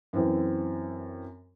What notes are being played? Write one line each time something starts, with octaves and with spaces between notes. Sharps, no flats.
F#2 E3 C4